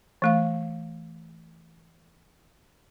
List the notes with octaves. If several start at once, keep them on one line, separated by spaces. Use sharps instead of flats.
E3 A3 F5